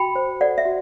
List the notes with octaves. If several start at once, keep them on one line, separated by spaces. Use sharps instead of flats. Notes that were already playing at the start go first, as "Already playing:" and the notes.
Already playing: F#4 G5 B5
C5
A4 D5 F#5
E5
F#4